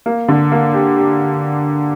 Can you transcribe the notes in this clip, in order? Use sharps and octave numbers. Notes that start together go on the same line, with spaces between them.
A#3
D3
A#3
G4
G4